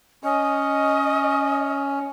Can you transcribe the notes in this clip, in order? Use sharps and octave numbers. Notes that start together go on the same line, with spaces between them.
C#4 D#5